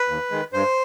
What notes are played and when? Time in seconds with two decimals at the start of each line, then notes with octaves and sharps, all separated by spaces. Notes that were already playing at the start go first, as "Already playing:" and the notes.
Already playing: B4
0.08 D#2
0.31 D#3 G#3
0.53 G2 C5